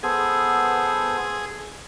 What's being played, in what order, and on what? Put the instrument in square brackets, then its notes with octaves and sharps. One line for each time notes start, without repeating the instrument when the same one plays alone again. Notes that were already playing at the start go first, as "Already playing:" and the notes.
[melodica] B3 A4 C5 [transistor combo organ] G#4